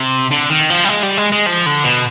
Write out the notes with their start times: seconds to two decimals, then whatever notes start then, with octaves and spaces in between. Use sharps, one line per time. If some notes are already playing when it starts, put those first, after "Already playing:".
Already playing: C3
0.31 D3
0.50 D#3
0.70 F3
0.85 G3
0.89 G#3
1.03 G3
1.17 G#3
1.32 G#3
1.46 F3
1.66 D3
1.84 B2